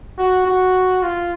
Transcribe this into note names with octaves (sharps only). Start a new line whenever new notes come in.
F#4
F#4
F4